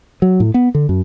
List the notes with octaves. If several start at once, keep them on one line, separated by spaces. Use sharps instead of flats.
F#3
A2
B3
D3
F#2